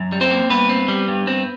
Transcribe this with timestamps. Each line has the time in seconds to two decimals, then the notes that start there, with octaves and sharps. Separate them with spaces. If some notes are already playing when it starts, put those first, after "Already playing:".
Already playing: F#2
0.12 G3
0.21 C4 C5
0.31 A#3
0.50 G2 B3 B4
0.69 C4
0.88 G3
1.08 G2
1.27 C4